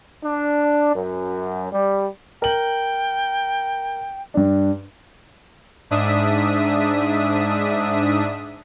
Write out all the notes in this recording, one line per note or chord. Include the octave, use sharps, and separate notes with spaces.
D4
F#2
G3
A#4 G5 F#7
G2 D4
G#2 D4 E5 D#6 B6